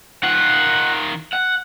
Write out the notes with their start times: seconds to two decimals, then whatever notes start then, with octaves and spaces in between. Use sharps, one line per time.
0.23 D#3 F4 F#5
1.33 F#5